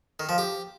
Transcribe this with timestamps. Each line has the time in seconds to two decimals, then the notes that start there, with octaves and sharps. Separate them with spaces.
0.20 D#3
0.29 F3
0.38 G4